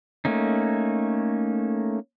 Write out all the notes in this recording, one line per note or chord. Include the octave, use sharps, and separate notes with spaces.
A3 A#3 C#4 D#4